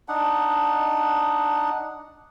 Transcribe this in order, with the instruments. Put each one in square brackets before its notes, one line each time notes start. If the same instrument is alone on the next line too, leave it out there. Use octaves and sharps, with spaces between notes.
[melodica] D4 D#4 F#5